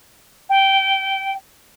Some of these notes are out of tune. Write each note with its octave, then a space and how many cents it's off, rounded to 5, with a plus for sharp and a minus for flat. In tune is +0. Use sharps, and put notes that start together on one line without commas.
G5 -15